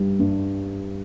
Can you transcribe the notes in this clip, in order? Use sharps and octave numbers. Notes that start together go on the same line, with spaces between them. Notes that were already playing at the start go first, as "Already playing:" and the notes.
Already playing: G2 G3
G2